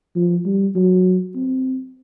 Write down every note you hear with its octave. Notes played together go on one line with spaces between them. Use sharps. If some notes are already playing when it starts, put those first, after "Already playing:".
F3
G3
F#3
C4